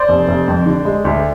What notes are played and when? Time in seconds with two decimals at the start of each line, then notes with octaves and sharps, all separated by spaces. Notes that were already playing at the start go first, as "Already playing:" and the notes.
Already playing: C5 D5
0.09 F1
0.28 F1
0.48 F2
0.66 D3
0.85 G#3
1.05 D2